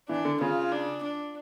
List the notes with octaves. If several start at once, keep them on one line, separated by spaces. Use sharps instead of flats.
E3 D4
D3
C#3 F4
D4
D4